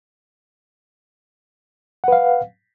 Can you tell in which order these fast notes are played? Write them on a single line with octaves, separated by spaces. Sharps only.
F#5 B4 F5